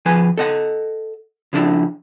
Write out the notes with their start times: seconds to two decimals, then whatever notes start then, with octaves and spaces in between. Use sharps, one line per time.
0.06 F3 G#4 B4 G#5
0.38 A4 D#5 F#5
1.53 C#3 F3 D4 E4